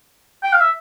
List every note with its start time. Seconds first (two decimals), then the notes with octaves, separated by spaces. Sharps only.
0.43 G5
0.53 F5
0.61 E5